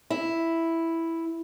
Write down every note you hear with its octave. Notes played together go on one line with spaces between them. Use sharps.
E4